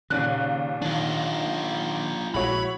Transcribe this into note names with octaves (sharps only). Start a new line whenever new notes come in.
D#2 A#2 C#3 F#6
D#3 D4 F4
A#1 C#3 G#3 E4 F#4 C#5 B5